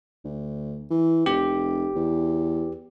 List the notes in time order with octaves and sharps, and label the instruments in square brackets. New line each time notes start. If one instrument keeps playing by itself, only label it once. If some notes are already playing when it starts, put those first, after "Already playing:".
[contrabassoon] D2
E3
[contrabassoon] F1 [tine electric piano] G4
[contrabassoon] E2